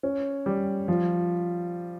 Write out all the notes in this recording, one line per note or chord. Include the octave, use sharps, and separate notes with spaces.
C#4
G3
F3